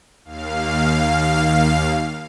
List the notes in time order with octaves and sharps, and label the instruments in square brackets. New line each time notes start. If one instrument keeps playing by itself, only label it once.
[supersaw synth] D#2 F5